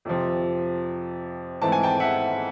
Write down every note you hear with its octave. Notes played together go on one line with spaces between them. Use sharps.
F2 C3 F3
G#2 E3 A3 C4 A5
G#5
G5 A5
E5 F#5